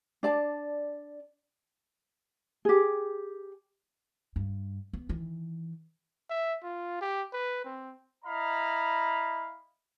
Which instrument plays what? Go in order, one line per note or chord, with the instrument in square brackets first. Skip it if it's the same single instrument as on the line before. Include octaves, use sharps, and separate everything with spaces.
[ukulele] D4 D5 A5
G4 G#4
[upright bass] G2
B3
D#3 E3
[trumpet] E5
F4
G4
B4
C4
[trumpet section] E4 D#5 F5 A#5 B5